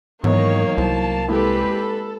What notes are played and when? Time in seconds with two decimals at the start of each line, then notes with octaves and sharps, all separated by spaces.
0.24 G#2 D#3 E3 F#3 A#3 B3 D#4 C#5
0.78 C2 E4 C5 A5
1.29 G#3 A#3 C4 E4 G4 A4 B4 B5
1.73 A4